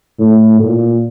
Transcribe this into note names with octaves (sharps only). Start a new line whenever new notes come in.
A2
A#2